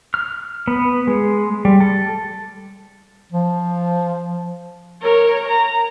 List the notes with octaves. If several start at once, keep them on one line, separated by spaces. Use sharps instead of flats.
F6
B3
G#3
G3
A4
F3
A#4 C#5
A#5